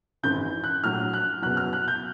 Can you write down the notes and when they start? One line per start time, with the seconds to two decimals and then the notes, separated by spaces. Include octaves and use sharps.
0.23 G#1 F#2 C#3 E3 G6
0.64 F#6
0.83 A#1 A2 F#3 F6
1.13 F#6
1.42 F#1 E2 B2 F#3 F#6
1.57 F6
1.73 F#6
1.88 G6